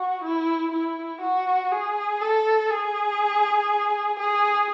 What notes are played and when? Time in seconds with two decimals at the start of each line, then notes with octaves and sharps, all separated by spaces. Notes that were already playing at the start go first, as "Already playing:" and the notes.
Already playing: F#4
0.24 E4
0.72 E4
1.22 F#4
1.72 G#4
2.21 A4
2.70 G#4
4.19 G#4